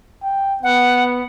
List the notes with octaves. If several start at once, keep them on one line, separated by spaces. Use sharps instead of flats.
G5
B3 F#5